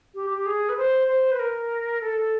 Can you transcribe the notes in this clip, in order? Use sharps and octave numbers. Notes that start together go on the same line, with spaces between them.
G4
G4
G#4
B4
C5
C5
B4
A#4
A4